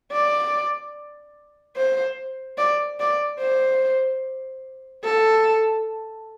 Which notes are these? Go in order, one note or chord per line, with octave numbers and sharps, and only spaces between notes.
D5
C5
D5
D5
C5
A4